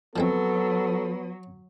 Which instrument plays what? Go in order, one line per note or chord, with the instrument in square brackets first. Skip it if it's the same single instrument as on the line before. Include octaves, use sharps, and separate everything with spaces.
[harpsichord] F3 G#3 C4 [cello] F#3 [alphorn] B3 [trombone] A4